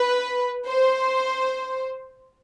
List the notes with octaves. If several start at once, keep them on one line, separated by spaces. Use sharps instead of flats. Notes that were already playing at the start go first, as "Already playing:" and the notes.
Already playing: B4
C5